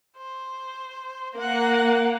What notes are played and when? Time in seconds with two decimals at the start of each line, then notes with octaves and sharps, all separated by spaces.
0.17 C5
1.37 A#3 F#5